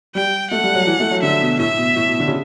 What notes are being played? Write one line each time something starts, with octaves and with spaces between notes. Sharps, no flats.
G3 G5
A3 F#5
G3
F#3
E3
A3
F#3
D3 E5
B2
A2 E5
B2
A2
B2
D3
C#3